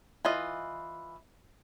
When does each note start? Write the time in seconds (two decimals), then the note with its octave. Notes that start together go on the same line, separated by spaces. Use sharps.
0.25 E3 F4 D#5